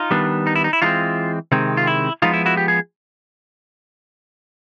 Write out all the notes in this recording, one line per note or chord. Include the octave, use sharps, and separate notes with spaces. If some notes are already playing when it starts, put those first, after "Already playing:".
Already playing: D#4 F4
D#3 G3 B3 D4
D#4
E4
D#4
E4
E3 G#3 C4 D#4 F4
C3 D#3 G#3 C4
F4
E4
F3 G#3 B3 D#4 F4
E4
E4 F#4
G4
G#4